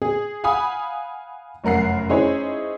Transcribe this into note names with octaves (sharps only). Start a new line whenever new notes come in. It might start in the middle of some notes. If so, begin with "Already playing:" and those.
G#4
F5 F#5 G#5 B5 D#6
F1 F#2 A#4 F#5 C7
C#4 D#4 E4 G#4 C5 C#5